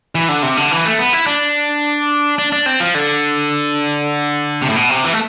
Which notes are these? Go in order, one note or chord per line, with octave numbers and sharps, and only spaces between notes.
E3
D3
C3
D3
E3
A3
B3
E4
D4
D4
D4
C4
F3
D3
C3
A2
B2
C3
E3
A3